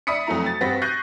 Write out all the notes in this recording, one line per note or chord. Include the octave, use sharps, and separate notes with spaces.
D5 E5 B5 D#6 B6 C#7
F2 F#3 A3 E4 A#5
A6
G2 C4 F#4 B4 A#6 B6
C#6 F#6 G6 A#6 C7 D#7